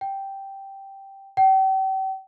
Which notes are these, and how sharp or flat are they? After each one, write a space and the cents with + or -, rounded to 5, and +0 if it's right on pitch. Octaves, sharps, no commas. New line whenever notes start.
G5 -5
G5 -40